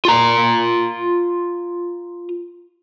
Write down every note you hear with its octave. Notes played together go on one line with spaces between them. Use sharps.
F4 A#5